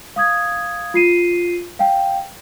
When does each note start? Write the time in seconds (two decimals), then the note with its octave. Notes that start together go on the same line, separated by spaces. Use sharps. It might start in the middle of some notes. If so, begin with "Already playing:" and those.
0.16 F5 D#6 G#6
0.94 F4 C7 D#7
1.79 F5 G5